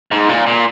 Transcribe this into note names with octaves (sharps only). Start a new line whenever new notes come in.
G#2
A#2
A#2